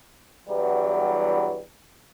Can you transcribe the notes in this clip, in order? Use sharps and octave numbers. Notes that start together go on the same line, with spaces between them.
E2 G2 E3 F#3 G3